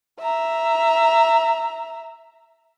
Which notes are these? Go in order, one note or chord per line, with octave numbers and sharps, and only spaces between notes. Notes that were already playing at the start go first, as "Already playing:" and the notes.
E5 A#5